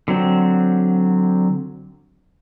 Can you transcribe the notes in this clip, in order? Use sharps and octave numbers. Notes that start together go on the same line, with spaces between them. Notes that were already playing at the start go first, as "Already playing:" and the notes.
D3 F#3 C4